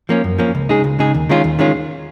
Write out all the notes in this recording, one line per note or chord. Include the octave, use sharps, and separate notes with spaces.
F3 A#3 C#4
F#2
F3 A#3 C#4
C#2
C#3 G#3 D#4 G#4
C#2
C#3 G#3 D#4 G#4
D#2
D#3 G#3 C#4 F4
D#2
D#3 G#3 C#4 F4